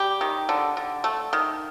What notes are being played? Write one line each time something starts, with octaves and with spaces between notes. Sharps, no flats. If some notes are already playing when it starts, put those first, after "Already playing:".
Already playing: G3 G4
D#3
D3
D3
A3
D#3